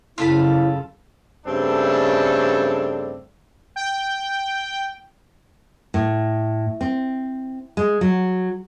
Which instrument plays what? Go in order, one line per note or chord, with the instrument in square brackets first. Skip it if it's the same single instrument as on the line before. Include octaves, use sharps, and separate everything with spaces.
[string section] F#2 C#3 [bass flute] E4 [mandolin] F4 A4 B5
[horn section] G2 C#3 A3 C4 D4 A4
[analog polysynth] G5
[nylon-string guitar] A2
C4
G#3
F#3